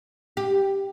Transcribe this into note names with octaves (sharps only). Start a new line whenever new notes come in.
G4